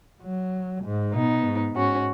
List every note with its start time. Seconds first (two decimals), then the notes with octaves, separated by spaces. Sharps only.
0.23 F#3
0.84 G#2
1.14 B2 B3 D#4
1.45 G#2
1.75 G#2 C#4 F#4